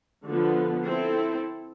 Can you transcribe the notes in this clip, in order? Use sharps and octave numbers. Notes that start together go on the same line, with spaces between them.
D3 F3 B3
C4 E4 A4